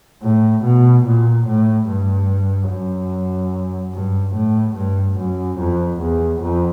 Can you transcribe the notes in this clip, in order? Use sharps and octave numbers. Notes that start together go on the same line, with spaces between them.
A2
B2
A#2
A2
G2
F#2
G2
A2
G2
F#2
F2
E2
F2